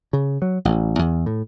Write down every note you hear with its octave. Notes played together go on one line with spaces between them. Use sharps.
C#3
F#3
A1
E2
A2